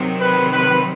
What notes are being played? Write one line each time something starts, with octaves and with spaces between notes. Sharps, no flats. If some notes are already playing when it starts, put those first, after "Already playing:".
Already playing: C3 D#3 F#3
B4
B4